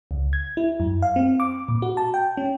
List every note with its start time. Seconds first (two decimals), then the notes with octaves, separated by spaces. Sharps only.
0.11 C#2
0.33 G#6
0.57 E4
0.80 F#2
1.02 F5
1.16 C4
1.40 D6
1.68 A#2
1.82 F#4
1.97 A5
2.14 G5
2.37 C#4